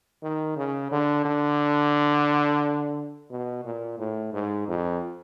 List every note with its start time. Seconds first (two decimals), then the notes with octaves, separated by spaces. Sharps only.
0.23 D#3
0.57 C#3
0.91 D3
1.25 D3
3.31 B2
3.65 A#2
3.99 A2
4.33 G#2
4.68 F2